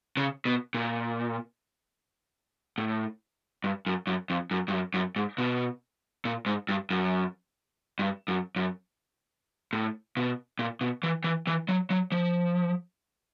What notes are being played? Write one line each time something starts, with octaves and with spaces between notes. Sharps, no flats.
C#3
B2
A#2
A2
G2
F#2
F#2
F2
F#2
G2
F#2
F#2
G#2
B2
A#2
G#2
G2
F#2
G2
F#2
F#2
A2
B2
A#2
B2
E3
E3
E3
F#3
F#3
F3